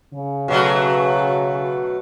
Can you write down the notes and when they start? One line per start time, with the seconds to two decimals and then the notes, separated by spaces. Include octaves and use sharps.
0.13 C#3
0.48 B2 F#3 A3